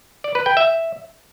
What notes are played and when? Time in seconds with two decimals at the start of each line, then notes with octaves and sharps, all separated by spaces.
0.24 D5
0.35 B4
0.46 G5
0.57 E5